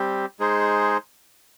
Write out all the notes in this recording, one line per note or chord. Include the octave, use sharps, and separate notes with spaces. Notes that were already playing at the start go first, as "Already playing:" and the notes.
Already playing: G3 C4 G4
G#3 D#4 G#4 C5